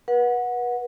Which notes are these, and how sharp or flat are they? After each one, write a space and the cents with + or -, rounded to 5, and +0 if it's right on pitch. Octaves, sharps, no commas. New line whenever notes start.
B4 -35 F#5 -15